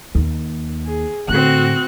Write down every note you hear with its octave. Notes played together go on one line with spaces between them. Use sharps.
D#2
G#4
A2 D3 C4 F#4 F#6